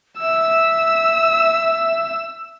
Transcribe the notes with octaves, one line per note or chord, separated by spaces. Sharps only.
E5 E6